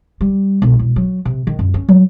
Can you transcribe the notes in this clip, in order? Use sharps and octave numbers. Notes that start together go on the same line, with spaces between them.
G3
B1
E1
F#3
C3
D#3
F#2
C#4
F#3